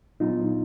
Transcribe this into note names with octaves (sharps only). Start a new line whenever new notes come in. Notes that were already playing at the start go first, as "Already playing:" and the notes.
A#2 F#3 B3 D4 D#4 F4